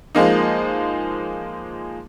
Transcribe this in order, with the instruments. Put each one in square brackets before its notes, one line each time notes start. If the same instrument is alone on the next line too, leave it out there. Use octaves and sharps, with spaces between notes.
[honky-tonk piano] F3 G#3 A#3 D#4